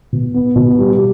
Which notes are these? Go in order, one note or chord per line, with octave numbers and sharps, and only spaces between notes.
B2
B3
B2
G3